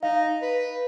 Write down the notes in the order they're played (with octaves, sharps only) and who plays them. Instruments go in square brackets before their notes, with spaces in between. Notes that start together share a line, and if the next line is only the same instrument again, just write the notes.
[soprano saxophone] D#4 [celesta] F5
[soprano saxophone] B4